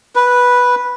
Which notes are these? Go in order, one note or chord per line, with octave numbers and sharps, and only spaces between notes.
B4